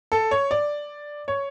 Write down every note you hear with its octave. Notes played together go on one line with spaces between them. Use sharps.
A4
C#5
D5
C#5